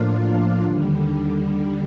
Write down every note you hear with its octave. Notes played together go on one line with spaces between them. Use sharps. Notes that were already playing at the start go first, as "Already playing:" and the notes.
Already playing: A2 F3 A#3 D4 F4
D#2 D3 G3